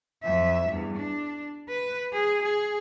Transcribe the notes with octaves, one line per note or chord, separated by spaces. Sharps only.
F2 E5
E2 G2
D4
B4
G#4
G#4